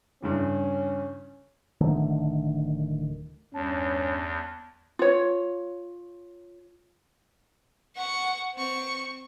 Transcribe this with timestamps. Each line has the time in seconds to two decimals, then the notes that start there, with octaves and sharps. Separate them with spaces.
0.22 G2 C#3 E3 C#4
1.81 D1 D3 D#3 A3
3.54 E2 G2 C#4 A5
4.99 F4 C#5
7.96 F#5 C#6
8.55 C4 C#6